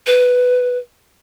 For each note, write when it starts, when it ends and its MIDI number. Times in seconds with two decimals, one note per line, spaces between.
0.07 0.78 71